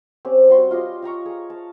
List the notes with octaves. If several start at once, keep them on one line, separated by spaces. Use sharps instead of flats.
C4 C#4 G4 C5
G3 F#4 C6 C#6
F4 G4 D#5
F5 G5 A#5 C#6
G#4
A5